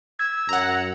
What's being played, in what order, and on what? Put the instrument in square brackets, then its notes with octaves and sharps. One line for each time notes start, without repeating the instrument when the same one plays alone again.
[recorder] E6 [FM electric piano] G#6
[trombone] F#2 [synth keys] F#5 A#5